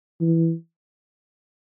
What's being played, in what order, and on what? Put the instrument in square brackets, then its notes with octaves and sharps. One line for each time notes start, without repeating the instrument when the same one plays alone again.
[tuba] E3